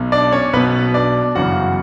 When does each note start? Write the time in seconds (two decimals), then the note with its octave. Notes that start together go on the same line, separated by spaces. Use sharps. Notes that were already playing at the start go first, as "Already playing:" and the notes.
Already playing: B1 B2
0.12 D4 D5
0.32 C#4 C#5
0.53 B1 B2 B3 B4
0.94 D4 D5
1.35 G1 F#2 C#3 E3 F#4 F#5